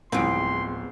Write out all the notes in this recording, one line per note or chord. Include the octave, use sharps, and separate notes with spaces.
D1 C2 F3 G#3 B3 C4 C6 D7